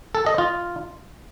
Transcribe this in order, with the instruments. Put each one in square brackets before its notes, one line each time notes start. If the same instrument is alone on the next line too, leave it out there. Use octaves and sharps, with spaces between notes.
[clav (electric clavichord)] A4
D#5
F4